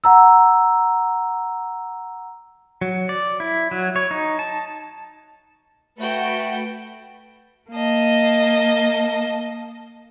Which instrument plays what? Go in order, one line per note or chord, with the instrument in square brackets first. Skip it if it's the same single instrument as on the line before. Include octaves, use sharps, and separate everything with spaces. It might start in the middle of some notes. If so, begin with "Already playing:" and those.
[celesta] F#5 A#5 E6
[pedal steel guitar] F#3
D5
E4
F#3
C#5
D#4
A5
[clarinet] A3 [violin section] F#4 B4 [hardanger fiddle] A4 G5
[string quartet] A#3 D#5 A5